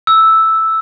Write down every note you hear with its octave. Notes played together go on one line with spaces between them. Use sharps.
E6